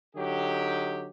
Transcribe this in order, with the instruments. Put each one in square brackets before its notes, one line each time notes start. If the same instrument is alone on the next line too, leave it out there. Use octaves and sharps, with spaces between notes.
[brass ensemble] D3 F#3 D#4 G4